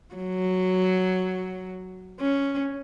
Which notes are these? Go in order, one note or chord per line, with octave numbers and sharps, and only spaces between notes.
F#3
C#4